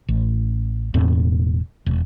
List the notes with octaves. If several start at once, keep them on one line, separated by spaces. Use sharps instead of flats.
A1
E1 E2 A2 C4
E1